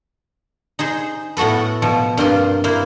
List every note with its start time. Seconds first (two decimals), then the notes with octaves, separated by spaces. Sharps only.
0.79 D#4 G#4 C5
1.37 A2 B3 F#4 A4 B4
1.82 B2 F3
2.17 G2 A#3 C4 F4 C6
2.64 A#3 E4 C5